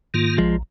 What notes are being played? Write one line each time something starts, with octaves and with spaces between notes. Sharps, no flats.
G#2 D#3 A#3 F4
A#1 F3 G#3